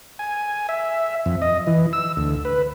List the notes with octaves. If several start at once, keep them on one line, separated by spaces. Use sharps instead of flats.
G#5
E5
F2
D#5
E3
E6
D2
B4